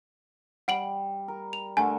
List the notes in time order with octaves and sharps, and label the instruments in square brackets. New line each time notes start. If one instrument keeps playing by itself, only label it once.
[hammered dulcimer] G3 [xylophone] F#5 D7 F#7
[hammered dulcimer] A#4
[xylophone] F7
[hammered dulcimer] D3 A3 A#4 [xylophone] G#5